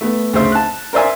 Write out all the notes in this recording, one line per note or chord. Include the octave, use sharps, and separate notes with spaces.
A3 B3
D2 C#3 C5 E5
A5 F#6
A#4 C5 D5 E5 G#5